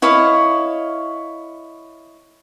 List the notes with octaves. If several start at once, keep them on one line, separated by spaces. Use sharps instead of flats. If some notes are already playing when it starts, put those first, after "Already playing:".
E4 C#5 D#5 F5